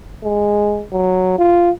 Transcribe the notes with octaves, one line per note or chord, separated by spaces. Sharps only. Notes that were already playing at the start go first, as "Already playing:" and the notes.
G#3
F#3
F4